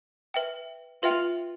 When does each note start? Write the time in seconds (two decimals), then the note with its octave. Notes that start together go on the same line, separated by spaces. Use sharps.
0.34 B4 E5 G5
1.03 F4 B4 E5 G5